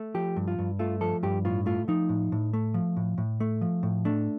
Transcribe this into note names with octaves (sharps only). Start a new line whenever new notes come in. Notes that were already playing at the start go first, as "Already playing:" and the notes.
Already playing: A3
F3 G4
G2
F4
G2
A3 F4
F3 A4
G2 G4
A2 F4
A3 F4
F3 D#4
A2
A2
A3
F3
A2
A2
A3
F3
A2
A3 D4